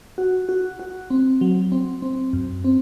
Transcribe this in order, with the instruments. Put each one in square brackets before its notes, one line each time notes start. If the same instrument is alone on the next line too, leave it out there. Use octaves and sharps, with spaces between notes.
[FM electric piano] F#4
F#4
F#4
C4
F#3
C4
C4
F#2
C4